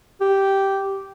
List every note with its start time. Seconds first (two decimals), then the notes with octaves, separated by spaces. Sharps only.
0.21 G4